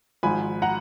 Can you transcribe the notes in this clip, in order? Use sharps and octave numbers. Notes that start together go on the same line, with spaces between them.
G#1 G#2 F3 G#5 B5
F#5 A#5